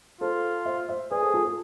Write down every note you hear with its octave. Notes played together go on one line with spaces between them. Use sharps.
F4 A4 C5
C5 E5
C5 E5
G#4 B4 D5
A4 C5
F4 A4
F4 A4